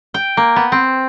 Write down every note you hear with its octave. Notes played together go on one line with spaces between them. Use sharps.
G5
A#3
B3
C4